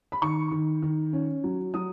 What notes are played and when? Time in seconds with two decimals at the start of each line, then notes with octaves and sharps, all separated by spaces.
0.12 B5
0.22 D#3 C#6
0.51 D#3
0.82 D#3
1.13 C#4
1.44 F#3
1.74 F#3 D#6